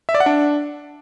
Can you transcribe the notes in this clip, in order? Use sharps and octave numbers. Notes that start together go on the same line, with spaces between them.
E5
D5
F#5
D4